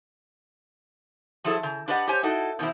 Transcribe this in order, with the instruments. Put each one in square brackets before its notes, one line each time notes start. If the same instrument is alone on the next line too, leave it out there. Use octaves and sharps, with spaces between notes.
[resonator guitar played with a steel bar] F3 F#3 E4 G#4 A4
C#3
D4 G4 B4 D5 D#5 F#5
G4 C5 C#5 G#5
D#4 E4 F#4 A4
B2 E3 C4 E4